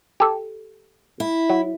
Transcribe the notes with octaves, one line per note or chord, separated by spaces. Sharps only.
G4 A4
E4
F#3